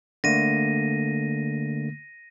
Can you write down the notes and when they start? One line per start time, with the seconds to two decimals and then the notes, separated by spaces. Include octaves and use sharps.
0.24 D3 A3 A#3 A#6 D#7